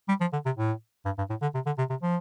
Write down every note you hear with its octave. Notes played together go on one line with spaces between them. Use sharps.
G3
F3
D3
C3
A2
G2
G2
A2
D3
C3
D3
C3
C3
F3